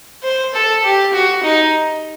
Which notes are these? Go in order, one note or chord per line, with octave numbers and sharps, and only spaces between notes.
C5
A4
G4
F#4
D#4